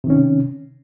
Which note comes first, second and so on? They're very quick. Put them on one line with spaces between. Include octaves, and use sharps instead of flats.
C3 D#3 C#4